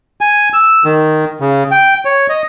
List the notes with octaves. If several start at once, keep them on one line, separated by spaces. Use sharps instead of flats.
G#5
E6
D#3
C#3
G5
C#5
D#5